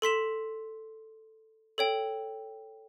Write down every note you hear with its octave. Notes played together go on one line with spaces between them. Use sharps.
A4 C6 B6 E7
A4 C#5 G5